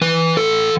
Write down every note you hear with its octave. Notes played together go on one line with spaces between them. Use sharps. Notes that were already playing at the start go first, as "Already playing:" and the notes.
E3 B4
A2 A4